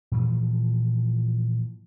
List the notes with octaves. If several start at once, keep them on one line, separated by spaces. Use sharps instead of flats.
A#2 E3 F3 G#3